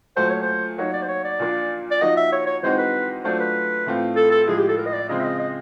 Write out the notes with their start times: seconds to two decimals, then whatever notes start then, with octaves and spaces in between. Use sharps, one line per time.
0.17 A#2 F#3 A3 C5
0.30 C#5
0.42 C5
0.78 F#3 A#3 D#4 F#4 C#5
0.94 D5
1.02 C5
1.08 C#5
1.24 D5
1.39 A#2 F3 A#3 D4
1.91 D5
2.01 F3 A#3 D#4 F#4 D#5
2.17 E5
2.32 C#5
2.47 C#5
2.63 E3 G#3 C4 D#4 F#4 C5
2.78 B4
3.24 F#3 A3 D4 F4 C5
3.39 B4
3.86 A2 E3 A3 C4 F4
4.16 A4
4.31 A4
4.47 A2 F3 G#3 G#4
4.58 G4
4.68 A4
4.77 A#4
4.86 D#5
4.93 D5
5.09 C#3 F3 G#3 C4 D#5
5.20 E5
5.24 D#5
5.39 D#5